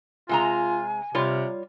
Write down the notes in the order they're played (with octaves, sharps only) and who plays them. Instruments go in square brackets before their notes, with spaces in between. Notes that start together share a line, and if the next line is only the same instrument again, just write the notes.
[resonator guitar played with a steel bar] C3 G#3 A#5 [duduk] F4 [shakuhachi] G#5
[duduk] C3 [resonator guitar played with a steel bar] G3 F4 C#5